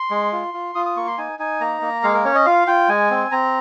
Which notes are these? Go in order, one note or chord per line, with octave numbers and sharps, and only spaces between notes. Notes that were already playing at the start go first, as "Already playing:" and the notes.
Already playing: C6
G#3
F4
F4
F4 D#6
D#6
A#3 C#6
C6
D#4 G#5
D#4 G#5
A#3 A#5
A#3
G#3 F5
A#4
C#4 C#5
D#5
F4 F5
F4 G5
G#3 G#5
C4
C4 A#5